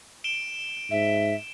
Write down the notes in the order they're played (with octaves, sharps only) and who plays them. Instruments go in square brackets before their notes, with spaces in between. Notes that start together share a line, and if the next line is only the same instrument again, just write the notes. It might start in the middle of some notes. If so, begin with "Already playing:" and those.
[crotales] D7 E7 G7
[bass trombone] G#2 [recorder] E5